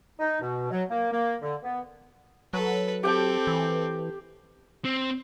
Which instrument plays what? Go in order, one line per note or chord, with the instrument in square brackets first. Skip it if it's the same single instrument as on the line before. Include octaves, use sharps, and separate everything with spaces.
[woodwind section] D#4
B2
F#3
A#3
A#3
D3
B3
[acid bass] F#3 [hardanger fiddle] A4 B4
[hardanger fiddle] C4 A4 [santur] G4 G5 A5
[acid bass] E3
[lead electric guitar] C4